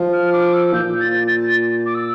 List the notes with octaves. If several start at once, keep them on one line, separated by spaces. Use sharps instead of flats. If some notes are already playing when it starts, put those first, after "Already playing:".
Already playing: F3
F6
D6
E6
A#2 G6
A6
A6
D6
E6